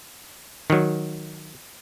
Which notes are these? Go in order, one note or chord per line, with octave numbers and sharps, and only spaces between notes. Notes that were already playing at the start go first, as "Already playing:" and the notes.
D#3 F#3